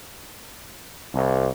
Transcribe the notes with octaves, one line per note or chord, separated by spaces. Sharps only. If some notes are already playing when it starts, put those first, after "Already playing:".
C2